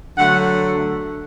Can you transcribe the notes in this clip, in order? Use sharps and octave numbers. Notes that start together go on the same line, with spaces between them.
D3 F#3 A3 F#5